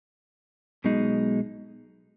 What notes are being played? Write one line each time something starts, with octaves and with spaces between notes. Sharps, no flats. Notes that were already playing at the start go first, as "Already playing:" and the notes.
B1 B2 G#3 D#4